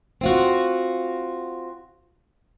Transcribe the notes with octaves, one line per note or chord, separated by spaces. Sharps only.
C4 F4 F#4